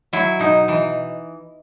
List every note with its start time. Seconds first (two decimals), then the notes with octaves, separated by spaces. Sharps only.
0.13 F#3 E4
0.39 B2 D#4
0.68 E3